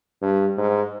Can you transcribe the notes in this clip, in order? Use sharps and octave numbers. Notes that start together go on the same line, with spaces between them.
G2
G#2